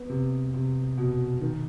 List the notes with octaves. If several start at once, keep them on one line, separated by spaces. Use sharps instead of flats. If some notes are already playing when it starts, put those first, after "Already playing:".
Already playing: B3
C3
C3
B2
D#3